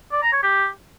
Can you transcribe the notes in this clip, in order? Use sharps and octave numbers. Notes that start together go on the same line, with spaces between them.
D5
A#5
C#5
G4